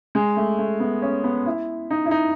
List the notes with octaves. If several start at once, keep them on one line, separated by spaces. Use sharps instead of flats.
G#3
A3
A3
B3
C#4
B3
E4
D#4
E4
D#4